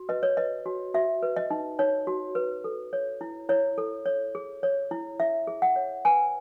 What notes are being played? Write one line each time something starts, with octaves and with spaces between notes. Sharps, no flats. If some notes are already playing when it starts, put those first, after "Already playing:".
Already playing: F#4
B4 D#5
C#5
B4 D#5
F#4
F#4 E5
B4
D#5
D#4
D#4 C#5
F#4
B4
A4
C#5
E4
E4 C#5
A4
C#5
G#4
C#5
E4
E4 E5
G#4
F#5
C#5
B4 G#5